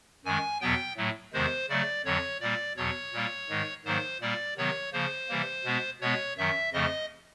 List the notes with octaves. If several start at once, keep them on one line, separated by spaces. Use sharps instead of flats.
F#2 D#3 G#3 G#5
E2 B2 F#3 B3 G5
A2 F#3 A3
E2 C3 D#3 G#3 C5
C#3 F#3 A3 D5
F2 D3 F#3 C#5
A#2 G3 A#3 D5
E2 B2 F#3 C#5
A#2 G3 A#3
G#2 D#3 G#3
G#2 D#3 F#3 A#3 C5
A#2 G3 A#3 D5
C3 D#3 F#3 B3 C#5
C#3 F3 A#3 C5
C3 E3 G3 A#3
B2 G#3 B3
B2 G#3 B3 C#5
F#2 D#3 F#3 E5
F2 C#3 F3 A3 D#5